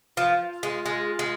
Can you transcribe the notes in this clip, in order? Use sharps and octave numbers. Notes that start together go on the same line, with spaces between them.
F3 F4
G#3
G#3
G#3